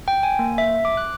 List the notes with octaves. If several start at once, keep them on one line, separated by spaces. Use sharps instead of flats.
G5
G#5
A#3
E5
D6
F#6